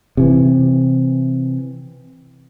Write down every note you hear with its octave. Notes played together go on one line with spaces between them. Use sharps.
C3 E3